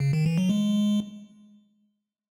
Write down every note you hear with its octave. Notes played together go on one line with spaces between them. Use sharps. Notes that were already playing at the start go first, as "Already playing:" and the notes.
C#3
D#3
E3
F#3
G#3